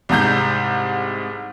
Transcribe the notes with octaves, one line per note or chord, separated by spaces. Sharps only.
C2 G#2 A#5 G6